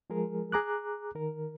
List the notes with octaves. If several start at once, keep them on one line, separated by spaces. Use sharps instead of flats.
F3 G#3 G#4 A#4
G#4 A#5 D6 F#6
D#3 A#4